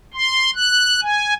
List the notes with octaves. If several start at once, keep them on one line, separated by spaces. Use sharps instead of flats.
C6
F#6
G#5